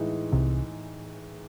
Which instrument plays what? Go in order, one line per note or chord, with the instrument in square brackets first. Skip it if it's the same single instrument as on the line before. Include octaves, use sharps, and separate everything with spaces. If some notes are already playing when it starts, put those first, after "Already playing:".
Already playing: [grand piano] A2 E3 G#3 D#4
[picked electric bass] C2 C3